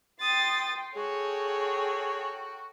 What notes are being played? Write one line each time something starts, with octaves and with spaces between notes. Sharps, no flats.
G5 C6 D#6 A6
F#4 G#4 A4 C#5 G5